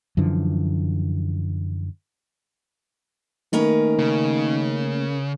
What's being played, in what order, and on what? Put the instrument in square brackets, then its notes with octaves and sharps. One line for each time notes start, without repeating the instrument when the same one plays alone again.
[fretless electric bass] F#2 D3 E3 F3
[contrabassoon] D#3 [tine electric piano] A3 A#3 [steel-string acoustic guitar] C#4 A#4 B4
[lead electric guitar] C#3